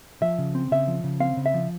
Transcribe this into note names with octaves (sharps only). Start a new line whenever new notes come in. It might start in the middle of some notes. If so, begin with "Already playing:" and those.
F3 E5
C#3
C4
C#3 E5
F3
C#3
C4 F5
C#3
E5
F3